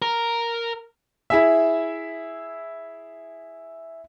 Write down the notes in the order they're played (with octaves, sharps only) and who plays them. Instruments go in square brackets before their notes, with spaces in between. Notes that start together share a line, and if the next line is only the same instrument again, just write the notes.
[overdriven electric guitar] A#4
[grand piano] E4 G#4 E5